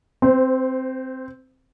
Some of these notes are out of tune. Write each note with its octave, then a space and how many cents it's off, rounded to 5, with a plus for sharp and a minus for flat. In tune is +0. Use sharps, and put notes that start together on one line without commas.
C4 +0 C5 -30